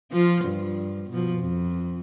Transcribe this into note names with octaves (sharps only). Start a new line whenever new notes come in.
F3 F4
G2
B2 F3
F2